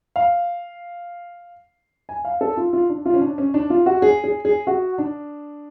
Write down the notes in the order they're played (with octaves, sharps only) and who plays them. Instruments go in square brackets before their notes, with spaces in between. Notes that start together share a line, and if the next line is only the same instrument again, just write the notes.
[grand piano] F5
G#5
F5
A4
F4
F4
D4
F4
C#4
D4
C#4
D4
F4
F#4
G#4
G#4
G#4
F#4
D4